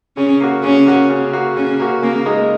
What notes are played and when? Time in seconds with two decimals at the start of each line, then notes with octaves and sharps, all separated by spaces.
0.17 C#3 C#4
0.40 A#3 F#4
0.63 C#3 C#4
0.86 A#3 F#4
1.10 C#3
1.33 A#3 F#4
1.56 C#3 C#4
1.80 A#3 F#4
2.02 C#3 A#3
2.26 G#3 D#4 A#4